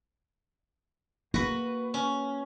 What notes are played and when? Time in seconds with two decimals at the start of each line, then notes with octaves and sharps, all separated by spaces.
1.34 A#3 F#4 B4
1.94 C#4